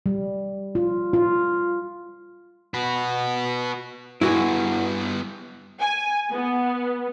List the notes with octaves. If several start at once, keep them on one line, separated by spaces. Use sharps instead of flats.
G3
F4
F4
F#4 B4
G2 B3 E4 F#4 G#4
G#5
B3